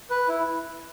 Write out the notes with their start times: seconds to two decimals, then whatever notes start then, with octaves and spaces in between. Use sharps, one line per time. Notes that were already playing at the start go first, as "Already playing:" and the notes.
0.10 B4
0.28 E4